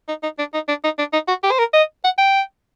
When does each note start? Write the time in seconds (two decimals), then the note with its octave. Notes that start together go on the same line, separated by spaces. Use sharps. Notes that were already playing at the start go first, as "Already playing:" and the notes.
0.09 D#4
0.23 D#4
0.38 D4
0.54 D#4
0.68 D4
0.84 D#4
0.98 D4
1.13 D#4
1.28 F#4
1.43 G4
1.51 C5
1.59 A#4
1.73 D#5
2.04 F#5
2.18 G5